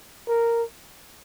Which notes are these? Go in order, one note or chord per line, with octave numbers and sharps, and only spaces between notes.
A#4